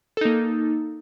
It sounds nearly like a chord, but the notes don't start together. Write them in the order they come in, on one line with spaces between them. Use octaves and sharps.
A4 D#4 A#3